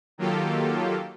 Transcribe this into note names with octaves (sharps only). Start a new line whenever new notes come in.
D#3 F#3 A#3 F4 G4 A4